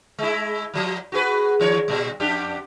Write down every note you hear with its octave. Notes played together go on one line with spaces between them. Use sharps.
G#3 E4
F3 F#3
F#4 G#4 B4
D#2 E3 C#5
A#2 G3
F2 D4 G4